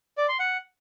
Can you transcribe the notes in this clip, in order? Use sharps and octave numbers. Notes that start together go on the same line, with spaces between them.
D5
C6
F#5